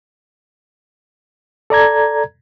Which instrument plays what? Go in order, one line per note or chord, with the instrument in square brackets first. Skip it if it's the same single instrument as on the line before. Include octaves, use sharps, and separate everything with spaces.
[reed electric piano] A4 D5 A#5 G#6